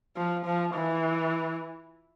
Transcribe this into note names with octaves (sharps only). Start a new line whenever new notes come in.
F3
F3
E3